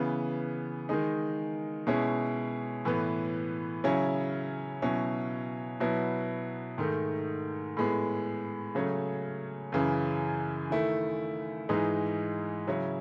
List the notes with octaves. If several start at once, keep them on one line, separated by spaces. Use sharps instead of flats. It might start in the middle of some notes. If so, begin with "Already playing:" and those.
Already playing: C#3 E3 B3
D#3 G#3 D#4
B2 G#3 C#4 E4
A2 E3 B3
C#3 F#3 C#4 E4
B2 F#3 C#4 E4
B2 F#3 B3 E4
G#2 D#3 A3
A2 G#3 B3
C#3 F#3 A3 C#4
F#2 C#3 E3
D#3 A3 E4
G#2 E3 G#3 D#4
C#3 F#3 C#4 E4